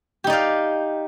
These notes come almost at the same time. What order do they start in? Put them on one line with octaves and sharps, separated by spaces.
G4 D#4 D5 F5